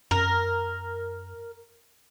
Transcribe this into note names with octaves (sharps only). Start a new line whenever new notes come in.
F#2 A#4